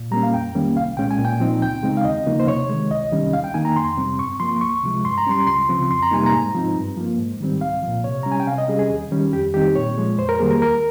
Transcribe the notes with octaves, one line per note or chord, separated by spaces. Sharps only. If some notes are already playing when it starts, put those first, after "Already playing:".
Already playing: A#2
G3 A#3 C#4 A#5
F5
F2 G5
D#3 G3 A#3 C#4
C2 F5
A#2 G#3 C#4 G5
G#5
A#2
G5
F3 C4 D#4
C#2 G5
C#3 G#3 C4 D#4
F5
D#2 D#5
C#3 F3 A#3 D#4
C5
C3 C#5
D#3 G#3
C2 D#5
C3 D#3 G3 C#4
D#2 F5
G5
D#3 A#3 D#4 G#5
A#5
F2 C6
C3 G3 C4
G2 C#6
F3 A#3 C6
C#2 C#6
C3 F3 G#3
G2 C6
A#5
G3 C#4 C6
C#2 C6
C#3 F3 C4
F2 C6
A#5
C3 G3 A#3 D#4 G#5
A#5
G#2
F3 C4 D#4
G2
F3 A#3
G#2
D#3 G3 C4
C2 F5
A#2 F3
C3 C#5
G3 C#4 A#5
G#5
G5
C3 F5
D#5
G3 C#4 G#4
G#4
D#2
D#3 G3 C#4
F2 G4
D#3 G3 C4 D#4 G4
A#2 C#5
F3 G#3
F2 C5
A#4
D#3 G3 A#3 G#4
A#4
D#2 A#4